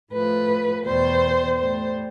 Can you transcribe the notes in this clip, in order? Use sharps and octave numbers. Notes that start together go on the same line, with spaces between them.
A2 F3 B4
E2 B2 G3 C5
A2 G3 C5